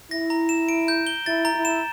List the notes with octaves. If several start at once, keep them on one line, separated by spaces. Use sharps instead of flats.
E4 A#6
A#5
E7
D7
G6
G7
E4 A6
A#5
E4
E7